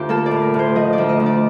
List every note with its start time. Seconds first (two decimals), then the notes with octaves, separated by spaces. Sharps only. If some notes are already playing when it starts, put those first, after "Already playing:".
Already playing: D2 F4 G4
0.09 A#3 A4
0.26 D5
0.31 A2
0.42 A#4
0.54 A2 C5
0.75 F3 D#5
0.93 D5
0.98 D2
1.09 D#5
1.20 D2
1.26 D5